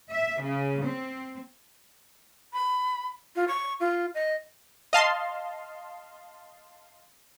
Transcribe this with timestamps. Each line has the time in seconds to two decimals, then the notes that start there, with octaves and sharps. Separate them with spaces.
0.11 E5
0.42 C#3
0.85 C4
2.53 B5
3.36 F4
3.48 C#6
3.80 F4
4.15 D#5
4.93 D#5 F5 A5 C6